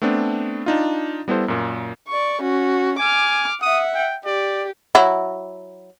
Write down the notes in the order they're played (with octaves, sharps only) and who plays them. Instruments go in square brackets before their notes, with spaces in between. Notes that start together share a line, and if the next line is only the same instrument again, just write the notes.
[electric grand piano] A3 B3 C4 D4
D4 D#4 F4
G3 B3 E4 A4 C5
F#2 A#2
[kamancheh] D5 C#6
C#4 F#4
[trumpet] G#5 [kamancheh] D6 F6
[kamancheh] E5 F#5 [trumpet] D#6
[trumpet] G5
[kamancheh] G4 [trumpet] D5
[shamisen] F#3 E4